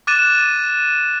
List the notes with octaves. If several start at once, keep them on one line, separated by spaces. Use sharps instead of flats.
D6 F#6 A6 D#7 E7